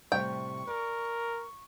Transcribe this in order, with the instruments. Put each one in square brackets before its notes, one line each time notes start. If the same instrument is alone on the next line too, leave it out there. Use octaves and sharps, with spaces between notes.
[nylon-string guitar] A2 C3 G3 [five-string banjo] G5 [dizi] C#6
[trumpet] A#4 [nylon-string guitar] D5